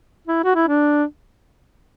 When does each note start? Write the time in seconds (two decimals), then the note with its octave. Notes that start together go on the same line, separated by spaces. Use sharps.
0.27 E4
0.44 F#4
0.55 E4
0.68 D4